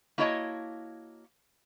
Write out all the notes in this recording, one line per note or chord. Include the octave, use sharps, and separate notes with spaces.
A#3 E4 F#4 C#5 D#5 A5